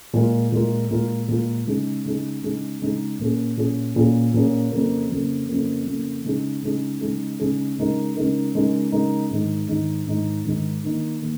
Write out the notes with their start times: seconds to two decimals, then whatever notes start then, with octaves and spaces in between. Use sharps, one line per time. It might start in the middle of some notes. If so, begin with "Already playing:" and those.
0.13 A#2 G#3 F4 A#4
0.52 A#2 G#3 F4 A#4
0.90 A#2 G#3 F4 A#4
1.28 A#2 G#3 F4 A#4
1.67 C#3 G#3 D#4 G#4
2.05 C#3 G#3 D#4 G#4
2.43 C#3 G#3 D#4 G#4
2.82 C#3 G#3 D#4 G#4
3.19 A#2 A#3 C#4 G#4
3.57 A#2 A#3 C#4 G#4
3.96 A#2 A#3 C#4 G#4
4.34 A#2 A#3 C#4 G#4
4.72 F2 C#3 A#3
5.11 F2 C#3 A#3
5.49 F2 C#3 A#3
5.86 F2 C#3 A#3
6.25 C#3 G#3 D#4 G#4
6.63 C#3 G#3 D#4 G#4
7.01 C#3 G#3 D#4 G#4
7.40 C#3 G#3 D#4 G#4
7.78 C#3 G#3 D#4 A#4
8.16 C#3 G#3 D#4 A#4
8.54 C#3 G#3 D#4 A#4
8.92 C#3 G#3 D#4 A#4
9.31 G#2 D#3 G#3 D#4
9.69 G#2 D#3 G#3 D#4
10.07 G#2 D#3 G#3 D#4
10.45 G#2 D#3 G#3 D#4
10.84 D#3 A#3 D#4
11.22 D#3 A#3